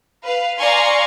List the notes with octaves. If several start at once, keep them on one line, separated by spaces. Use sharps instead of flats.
B4 F5
D5 F5 G#5 A#5 C6 C#6